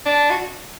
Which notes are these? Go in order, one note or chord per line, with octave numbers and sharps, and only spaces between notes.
D4
F#4